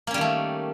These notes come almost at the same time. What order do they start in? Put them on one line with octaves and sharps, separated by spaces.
A#3 C#4 G3 D#3 A3